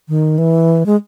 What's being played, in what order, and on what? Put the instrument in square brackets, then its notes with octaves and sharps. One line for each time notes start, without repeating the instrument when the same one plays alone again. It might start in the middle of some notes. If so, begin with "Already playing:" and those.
[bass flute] D#3
E3
G#3